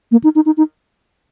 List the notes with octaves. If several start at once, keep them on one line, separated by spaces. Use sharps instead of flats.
A#3
D#4
D#4
D#4
D#4